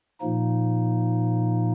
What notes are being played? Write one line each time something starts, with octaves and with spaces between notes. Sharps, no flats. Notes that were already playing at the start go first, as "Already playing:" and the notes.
A#2 F3 A#3 D#4